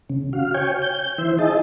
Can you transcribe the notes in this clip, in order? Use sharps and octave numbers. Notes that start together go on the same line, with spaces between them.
C#3
F#4 F5
C#5 G5 G#5
G6
E3 C5 E5
D#4 E4 G#4 D#5 A5